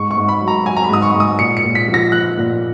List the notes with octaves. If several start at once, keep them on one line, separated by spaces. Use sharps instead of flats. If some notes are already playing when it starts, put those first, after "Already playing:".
Already playing: G#2 C#6
C#6
G#2
B5
F#3
A#5
F#3 G#5
A#5
B5
G#2 D#6
C#6
G#2
D#6
A#2 C#7
C#7
A#2
B6
F3
A#6
F3 F#6
A#2